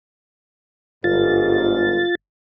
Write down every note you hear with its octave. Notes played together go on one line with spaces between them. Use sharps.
G1 G#2 F4 A6